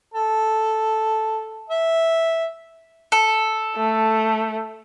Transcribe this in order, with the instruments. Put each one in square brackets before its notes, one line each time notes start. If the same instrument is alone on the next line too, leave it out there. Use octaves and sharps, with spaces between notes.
[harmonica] A4
E5
[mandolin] A4
[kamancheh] A3